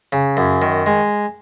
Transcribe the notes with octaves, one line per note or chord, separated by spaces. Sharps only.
C#3
F#2
D#3
G#3